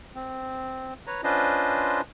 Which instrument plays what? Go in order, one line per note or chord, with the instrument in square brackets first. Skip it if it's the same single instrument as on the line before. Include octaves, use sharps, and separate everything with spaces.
[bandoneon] C4
B4 C#5 A#5
C#4 D4 F4 B4 C5 D#5